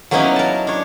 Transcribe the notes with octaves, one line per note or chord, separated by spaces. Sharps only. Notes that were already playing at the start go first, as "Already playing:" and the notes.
F#3 A#3 B3 C#4 D#4 E4
A#4 A5
D4 C#5